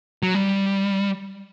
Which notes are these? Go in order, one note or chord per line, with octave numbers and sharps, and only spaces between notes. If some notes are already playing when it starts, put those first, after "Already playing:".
F#3
G3